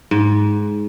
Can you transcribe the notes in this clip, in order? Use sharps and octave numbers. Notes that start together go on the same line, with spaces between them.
G#2